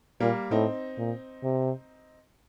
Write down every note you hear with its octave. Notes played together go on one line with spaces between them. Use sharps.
A#2 G3 A#3
A2 C4 D#4
A#2
C3